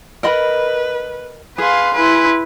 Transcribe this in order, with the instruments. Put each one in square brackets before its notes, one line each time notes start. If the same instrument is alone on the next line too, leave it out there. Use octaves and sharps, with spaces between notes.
[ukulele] A#4 D#5 B5 [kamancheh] B4
[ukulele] G#4 [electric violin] B4 F5 [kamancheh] G#5 C6
[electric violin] E4 B4 [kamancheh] G#5 C6